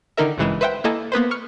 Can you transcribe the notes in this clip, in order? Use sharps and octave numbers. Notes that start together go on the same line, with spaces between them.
D3 D#3 D#4 E4 A#4 E5
G#1 G2 C#3 E3 G#3 E7
B4 C5 E5 F#5 G5
A#3 E4 A4 D#5 G#5 A5
A#3 B3 B4 C5
C#6 F6 C#7